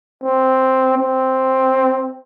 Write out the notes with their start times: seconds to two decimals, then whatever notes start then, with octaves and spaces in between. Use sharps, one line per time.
0.23 C4
0.98 C4